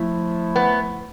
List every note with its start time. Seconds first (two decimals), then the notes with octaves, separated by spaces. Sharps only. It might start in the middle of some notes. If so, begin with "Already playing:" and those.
Already playing: F3 A3 E4
0.56 B3